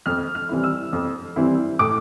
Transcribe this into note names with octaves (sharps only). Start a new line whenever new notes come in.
F2 F6
F6
E3 G3 C4 E4
E6
F2
E3 G3 C4 E4
A2 D6